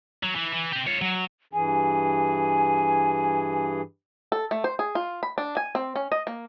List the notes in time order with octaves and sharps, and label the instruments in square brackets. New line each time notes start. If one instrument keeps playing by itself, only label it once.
[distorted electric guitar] F#3
E3
E3
C4 G4
F4 C#5
F#3
[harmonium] G2 E3 G#4 [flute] G#5
[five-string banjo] A4
A3
C5
G#4
F4
B5
D4
G#5
C4
C#4
D#5
A#3